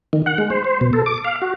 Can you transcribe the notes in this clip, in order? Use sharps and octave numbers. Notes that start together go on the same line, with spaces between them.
D#3
F#5
G#3
C5
C5
B2
A4
D6
F5
F#4